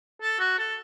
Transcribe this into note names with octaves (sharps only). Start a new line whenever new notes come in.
A4
F#4
A4